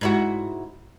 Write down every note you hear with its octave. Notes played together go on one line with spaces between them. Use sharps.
G#2 E4 F#4